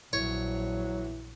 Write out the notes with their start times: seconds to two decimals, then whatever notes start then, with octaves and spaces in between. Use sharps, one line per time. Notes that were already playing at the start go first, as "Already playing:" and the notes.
0.13 A#1 E3 F#3 C#5